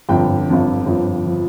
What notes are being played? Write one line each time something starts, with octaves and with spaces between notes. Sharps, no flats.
G1 F2 D3 G5
G1 F2 D3
G1 F2 F3
F3